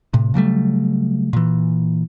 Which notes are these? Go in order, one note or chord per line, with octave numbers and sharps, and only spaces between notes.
A2 C3
C#3 F#3 G3 A3
A#2 E3